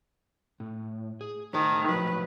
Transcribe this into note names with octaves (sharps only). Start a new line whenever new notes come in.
A2
G#4
A2 D#3 C5 A5
A2 F3 F#3 B4